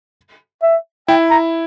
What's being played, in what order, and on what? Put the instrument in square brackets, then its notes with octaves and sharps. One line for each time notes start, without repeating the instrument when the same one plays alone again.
[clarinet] E5
[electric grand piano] E4 [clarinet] G5
[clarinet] A#5